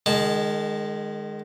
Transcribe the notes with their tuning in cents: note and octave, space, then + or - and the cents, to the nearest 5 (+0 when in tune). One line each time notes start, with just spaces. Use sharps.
D#3 -30 G#3 +0 A5 +0